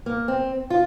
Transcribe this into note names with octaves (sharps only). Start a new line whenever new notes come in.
A#3
C4
F4